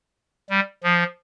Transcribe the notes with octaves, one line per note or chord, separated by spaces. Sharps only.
G3
F3